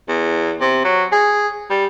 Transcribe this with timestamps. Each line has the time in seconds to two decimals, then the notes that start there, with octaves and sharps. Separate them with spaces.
0.08 E2
0.61 C3
0.85 F#3
1.12 G#4
1.70 G3